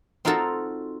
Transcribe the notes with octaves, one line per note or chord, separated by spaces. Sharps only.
C4 D#4 F4 F#4 A4 A#5